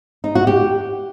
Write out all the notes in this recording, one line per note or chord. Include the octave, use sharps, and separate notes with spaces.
D#4
F#4
G4